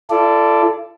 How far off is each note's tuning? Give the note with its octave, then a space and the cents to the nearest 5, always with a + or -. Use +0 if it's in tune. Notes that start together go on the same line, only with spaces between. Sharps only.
F4 -45 A4 +0 D5 +0